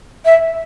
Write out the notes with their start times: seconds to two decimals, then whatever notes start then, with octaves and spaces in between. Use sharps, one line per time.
0.25 E5